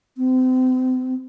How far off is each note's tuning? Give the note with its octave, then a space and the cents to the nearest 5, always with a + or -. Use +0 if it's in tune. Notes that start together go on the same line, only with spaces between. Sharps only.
C4 -35